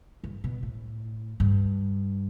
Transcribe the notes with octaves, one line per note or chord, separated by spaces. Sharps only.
G2
B2
A2
G2